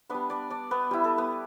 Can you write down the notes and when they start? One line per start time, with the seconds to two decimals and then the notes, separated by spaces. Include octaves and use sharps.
0.10 G3 B3 D4 B4
0.30 D4 D5
0.50 D4 D5
0.71 B3 B4
0.91 G3 E4 G4
1.04 A4
1.18 B3 B4